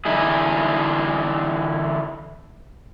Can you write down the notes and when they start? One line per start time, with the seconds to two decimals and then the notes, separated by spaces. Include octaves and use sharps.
0.05 D3 E3 D#4 E4 G#4